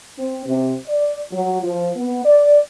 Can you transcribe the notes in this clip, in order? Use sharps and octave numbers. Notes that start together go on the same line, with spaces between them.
C4
C3
D5
F#3
F3
B3
D5